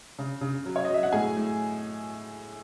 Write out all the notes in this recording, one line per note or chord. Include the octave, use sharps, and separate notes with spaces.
C#3
C#3
F#3
C#5
D#5
F#3 E5
F#5
A2 G#4 G#5
A2